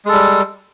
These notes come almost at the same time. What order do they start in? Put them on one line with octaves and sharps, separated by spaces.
G#3 A4 G3